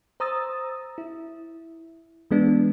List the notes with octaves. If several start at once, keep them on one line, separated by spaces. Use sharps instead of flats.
C5 A#5 D#6 E6 A6
E4
E3 G#3 B3 D4